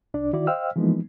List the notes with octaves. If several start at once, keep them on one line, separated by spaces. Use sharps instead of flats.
C2 D4 D5
D#3 E4 F#4 D5
C5 D#5 F5 G5 E6 F6
E3 F3 G#3 A#3 B3 D#4